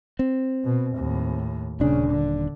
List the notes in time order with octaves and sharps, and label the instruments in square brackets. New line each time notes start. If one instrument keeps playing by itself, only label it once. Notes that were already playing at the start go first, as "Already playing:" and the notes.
[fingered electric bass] C4
[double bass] B2
D#2 A2
[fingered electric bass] D#1 D4 [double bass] A#2 C#3
[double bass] D3